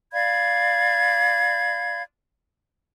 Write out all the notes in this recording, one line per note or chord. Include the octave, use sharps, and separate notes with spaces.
D5 F5 B5 G#6